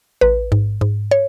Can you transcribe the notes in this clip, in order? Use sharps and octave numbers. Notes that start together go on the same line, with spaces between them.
A1 B4
G#2
G#2
C#5